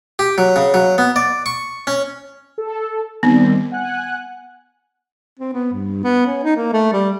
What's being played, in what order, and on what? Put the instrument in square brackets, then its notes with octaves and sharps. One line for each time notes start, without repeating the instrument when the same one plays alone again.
[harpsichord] G4
F#3
C#3
F#3
B3
D5
C#6
C#4
[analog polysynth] A4
[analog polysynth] D#3 G3 C4 [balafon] B3
[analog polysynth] F#5 G#5 F#6
[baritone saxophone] C4
B3
G2
B3
C#4
D#4
A#3
A3
G3